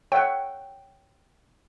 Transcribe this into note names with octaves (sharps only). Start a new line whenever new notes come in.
C#5 E5 F#5 G5